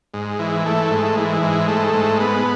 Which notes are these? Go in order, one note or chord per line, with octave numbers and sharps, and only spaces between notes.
G#2
E3
A3
G#2
E3
G#2
A3
G#2
B3